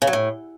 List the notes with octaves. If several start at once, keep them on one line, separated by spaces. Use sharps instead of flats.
C#3
F#3
A2